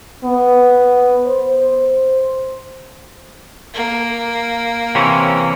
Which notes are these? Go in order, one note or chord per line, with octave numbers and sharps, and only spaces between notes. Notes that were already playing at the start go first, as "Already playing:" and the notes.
B3
C5
A#3
C3 E3 C#4